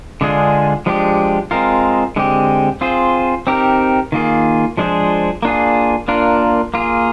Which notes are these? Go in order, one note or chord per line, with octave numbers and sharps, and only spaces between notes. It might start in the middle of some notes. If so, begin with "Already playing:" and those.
D3 G#3 D4 F4 G#4
F3 G#3 D4 G4
G#3 C4 F4 A#4
D3 G#3 C4 G4
C4 F4 G#4 C5
C4 D#4 G4 A#4
D#3 A#3 F4 G#4
F3 G#3 D4 G#4 C5
A#3 D4 F4 G#4
A#3 D4 F4 A#4
A#3 F4 G#4